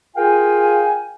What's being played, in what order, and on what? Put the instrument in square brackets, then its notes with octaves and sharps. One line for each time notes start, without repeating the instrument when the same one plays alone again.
[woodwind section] F4 G#4 A#4 F5 G5 G#5